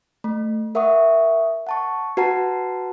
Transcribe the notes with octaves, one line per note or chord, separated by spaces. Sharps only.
A3
A#4 E5 F#5 C#6 D#6
F#5 A5 C#6
F#4 B4 F#5 A5 A#5 C7